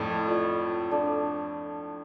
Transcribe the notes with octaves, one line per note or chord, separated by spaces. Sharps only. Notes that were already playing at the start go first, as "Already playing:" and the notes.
Already playing: F2 A2 A4 D5 A5
F4 A4 D5
D4 A4 D5 A5 D6